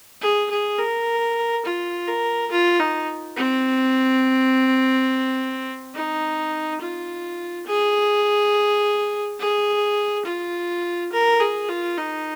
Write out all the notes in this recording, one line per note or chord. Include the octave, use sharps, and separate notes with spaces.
G#4
G#4
A#4
F4
A#4
F4
D#4
C4
D#4
F4
G#4
G#4
F4
A#4
G#4
F4
D#4